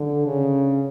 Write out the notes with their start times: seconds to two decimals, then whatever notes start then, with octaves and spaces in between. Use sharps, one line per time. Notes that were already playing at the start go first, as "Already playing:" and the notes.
Already playing: D3
0.25 C#3